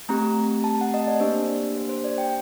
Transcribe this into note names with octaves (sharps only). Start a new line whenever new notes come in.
A3 C4 G4 A#5
A5
F#5
D#5
D5
A#3 D4 G4 C5
C5
C5
D5
G5